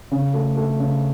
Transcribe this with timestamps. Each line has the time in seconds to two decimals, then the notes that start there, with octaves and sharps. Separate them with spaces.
0.11 C#3
0.34 A3
0.57 A3
0.79 C#3